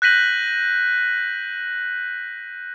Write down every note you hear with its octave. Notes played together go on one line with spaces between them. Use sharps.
F#6 G6 A#6 B6 D#7 F#7